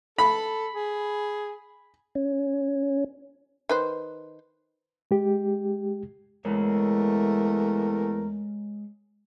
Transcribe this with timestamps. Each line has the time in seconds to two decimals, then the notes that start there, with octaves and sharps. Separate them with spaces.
0.18 A4 B5
0.74 G#4
2.15 C#4
3.69 D#3 B4 C5
5.11 G#3 G4
6.45 E2 G#3 A3 A#4 C#5